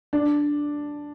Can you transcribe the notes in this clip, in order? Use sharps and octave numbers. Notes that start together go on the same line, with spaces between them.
D4